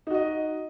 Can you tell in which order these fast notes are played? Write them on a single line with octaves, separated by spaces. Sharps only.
D#4 F#4 D#5